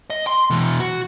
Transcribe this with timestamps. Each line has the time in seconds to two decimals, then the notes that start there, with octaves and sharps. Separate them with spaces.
0.10 D#5
0.27 C6
0.50 B2 E3
0.80 F#4